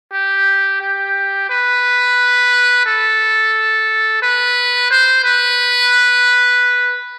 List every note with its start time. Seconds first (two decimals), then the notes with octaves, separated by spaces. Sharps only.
0.12 G4
0.81 G4
1.50 B4
2.86 A4
4.22 B4
4.91 C5
5.24 B4